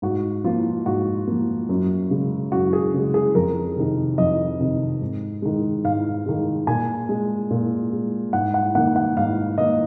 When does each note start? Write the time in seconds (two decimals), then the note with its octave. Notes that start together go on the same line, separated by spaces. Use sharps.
0.02 G#2 F#4
0.44 F3 A#3 F4
0.86 G#2 F#4
1.27 F3 A#3
1.69 F#2
2.10 C#3 G#3
2.52 F#2 F#4
2.73 G#4
2.93 C#3 G#3
3.14 G#4
3.35 F2 A#4
3.76 C3 D#3
4.18 F2 D#5
4.60 C3 D#3
5.01 G#2
5.42 D#3 G#3
5.84 G#2 F5
6.26 D#3 G#3
6.67 A#2 G#5
7.09 G#3
7.50 A#2
7.92 G#3
8.33 G#2 F#5
8.54 F#5
8.75 D#3 A#3 F#5
8.96 F#5
9.17 G#2 F5
9.58 D#3 A#3 D#5